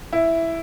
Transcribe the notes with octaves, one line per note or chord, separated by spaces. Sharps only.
E4